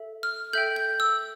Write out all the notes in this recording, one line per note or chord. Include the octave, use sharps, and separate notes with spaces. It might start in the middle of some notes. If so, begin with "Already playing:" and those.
Already playing: A4 E5
F6
A4 E5 G5 G6
G6
E6